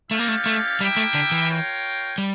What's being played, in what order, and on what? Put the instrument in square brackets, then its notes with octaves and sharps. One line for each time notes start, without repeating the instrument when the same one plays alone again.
[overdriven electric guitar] A3 [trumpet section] C#4 E4 G4 D5 F5
[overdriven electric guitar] A#3
A3
A3
[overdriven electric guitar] G3 [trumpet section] E4 G4 A#4 E5 G5
[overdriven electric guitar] A3
D3
E3
[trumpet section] F4 A#4 C#5 G5
[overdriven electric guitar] G3